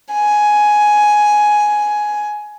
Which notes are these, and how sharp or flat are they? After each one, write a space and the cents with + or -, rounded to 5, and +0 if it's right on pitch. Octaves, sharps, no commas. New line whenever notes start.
G#5 +10